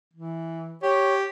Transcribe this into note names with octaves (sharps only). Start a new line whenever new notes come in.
E3
G4 C#5